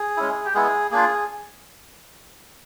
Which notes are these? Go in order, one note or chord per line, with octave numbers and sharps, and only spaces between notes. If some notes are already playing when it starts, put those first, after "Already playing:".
Already playing: G#4
G#3 C#4 E4
G4
G#3 B3 E4 G#4
A#3 D4 F4 G#4